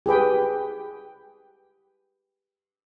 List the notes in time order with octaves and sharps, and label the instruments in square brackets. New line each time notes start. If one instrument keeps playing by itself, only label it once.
[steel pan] G4 G#4 B4 G5